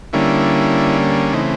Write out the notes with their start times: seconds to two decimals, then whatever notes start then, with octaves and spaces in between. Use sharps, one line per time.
0.13 D3 G3 A#3 C#4 E4
1.33 C#3 E3 A3 C4 D#4